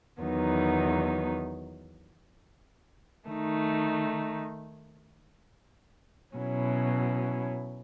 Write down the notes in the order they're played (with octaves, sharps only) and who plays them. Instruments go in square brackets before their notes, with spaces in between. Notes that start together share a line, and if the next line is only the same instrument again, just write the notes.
[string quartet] E2 D#3 F#3 B3 D#4
D#3 A3 D#4
B2 F#3 C#4 E4